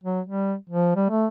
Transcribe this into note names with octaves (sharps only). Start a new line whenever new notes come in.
F#3
G3
F3
G3
A3